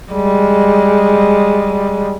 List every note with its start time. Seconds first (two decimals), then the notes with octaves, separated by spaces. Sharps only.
0.13 G3 G#3